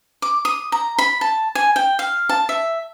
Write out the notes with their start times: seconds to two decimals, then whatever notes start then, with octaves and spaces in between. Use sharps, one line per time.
0.22 D6
0.45 D#6
0.72 A#5
0.99 B5
1.21 A5
1.55 G#5
1.76 G5
1.99 F5
2.29 A5
2.49 E5